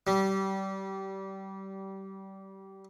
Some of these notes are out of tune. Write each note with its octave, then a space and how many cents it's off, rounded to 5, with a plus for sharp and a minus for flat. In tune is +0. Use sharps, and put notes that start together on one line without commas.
G3 -25